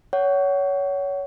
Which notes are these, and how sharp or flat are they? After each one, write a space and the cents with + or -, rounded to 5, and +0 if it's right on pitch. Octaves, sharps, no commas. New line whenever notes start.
C#5 +20 F#5 +25